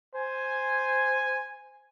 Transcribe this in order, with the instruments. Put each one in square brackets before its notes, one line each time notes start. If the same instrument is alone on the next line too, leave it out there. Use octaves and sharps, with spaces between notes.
[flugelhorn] C5 [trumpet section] G#5